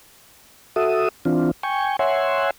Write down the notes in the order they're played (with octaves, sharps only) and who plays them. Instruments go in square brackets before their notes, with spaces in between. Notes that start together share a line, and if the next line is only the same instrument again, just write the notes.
[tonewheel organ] F#4 A4 E5 D#6
E3 C4 D4 F4
G5 G#5 C#6
C#5 E5 F#5 G#5 C6